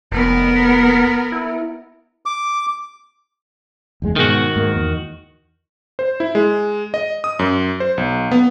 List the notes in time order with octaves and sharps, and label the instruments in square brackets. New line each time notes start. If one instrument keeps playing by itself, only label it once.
[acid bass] F1 [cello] B3 A#4
[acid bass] E4
[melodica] D6
[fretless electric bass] F#1 E2 G#3
[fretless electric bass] G#2 B2 G#3 [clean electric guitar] D#3 F#4
[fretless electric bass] G#2 A#3
E2
[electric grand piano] C5
E4
G#3
D#5
D#6
F#2
C5
B1
B3